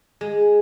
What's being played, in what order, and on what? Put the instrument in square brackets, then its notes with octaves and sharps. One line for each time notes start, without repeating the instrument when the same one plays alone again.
[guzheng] G#3